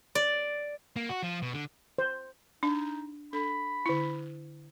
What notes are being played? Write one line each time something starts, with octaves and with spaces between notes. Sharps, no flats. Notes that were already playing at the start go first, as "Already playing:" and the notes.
D5
A#3
F#4
F3
B2
D3
C5
D4 D#4 A5
D4 A4 B5
D3 E4